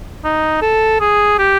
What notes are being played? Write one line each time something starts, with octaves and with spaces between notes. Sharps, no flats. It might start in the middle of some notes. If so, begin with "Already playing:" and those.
D#4
A4
G#4
G4